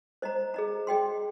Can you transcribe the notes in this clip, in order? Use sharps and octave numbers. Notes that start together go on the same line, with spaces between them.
C5 D#5 A#5
G#4 D#5 A#5
G#4 D#5 G5 C6